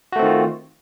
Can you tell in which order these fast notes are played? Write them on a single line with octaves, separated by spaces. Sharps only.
F#4 A3 C4 D#3 F4